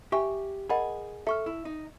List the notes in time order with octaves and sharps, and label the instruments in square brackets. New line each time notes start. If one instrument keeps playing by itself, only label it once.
[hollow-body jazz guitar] G4 [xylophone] E5 G#5 C#6
[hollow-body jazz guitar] G#4 [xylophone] A#4 D#5 F#5 B5
[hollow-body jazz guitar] A4 [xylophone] E5 A5 C#6 F6
[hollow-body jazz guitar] E4
D#4